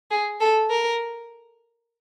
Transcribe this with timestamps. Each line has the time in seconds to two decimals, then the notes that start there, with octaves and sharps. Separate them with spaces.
0.10 G#4
0.40 A4
0.70 A#4